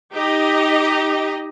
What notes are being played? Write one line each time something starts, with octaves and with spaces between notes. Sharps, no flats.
D#4 G4 D#5